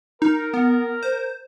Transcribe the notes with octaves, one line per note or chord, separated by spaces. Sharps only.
D#4 A#4
B3
C5